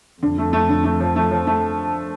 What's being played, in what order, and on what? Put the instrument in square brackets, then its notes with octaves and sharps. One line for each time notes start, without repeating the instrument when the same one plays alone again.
[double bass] F2 [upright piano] D3
[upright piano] A3
A3
D3
A3
F3
A3
F3
A3